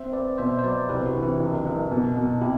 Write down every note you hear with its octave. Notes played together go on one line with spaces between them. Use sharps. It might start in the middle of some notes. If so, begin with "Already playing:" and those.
Already playing: C4 C5 E5
C4 B4 D5
B2 C5 E5
C5
F#3 B4 D5
C2 G4 B4
D4 F#4
E3
C4 E4
F#1
F#1
B2
B2
C3 E4 G4